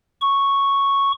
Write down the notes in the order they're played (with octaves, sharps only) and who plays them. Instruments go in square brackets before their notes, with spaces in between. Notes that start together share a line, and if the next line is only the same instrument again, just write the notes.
[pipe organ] C#6